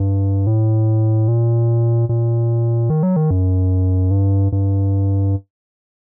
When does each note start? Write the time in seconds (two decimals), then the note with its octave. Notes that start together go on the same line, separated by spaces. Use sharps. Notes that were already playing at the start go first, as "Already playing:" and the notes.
Already playing: G2
0.47 A2
1.28 A#2
2.09 A#2
2.90 D#3
3.03 F#3
3.16 D#3
3.31 F#2
4.11 G2
4.52 G2